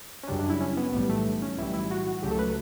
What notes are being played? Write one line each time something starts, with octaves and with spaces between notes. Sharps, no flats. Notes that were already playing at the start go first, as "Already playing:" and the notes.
C#4
F#2 C#3 G3 D4
D4
E4
C#4
B3
B1 A2 E3 G3 B3
A3
C#4
B1 A2 E3 G3 E4
E4
F#4
C#2 C#3 F#3 A3 G4
A4
B4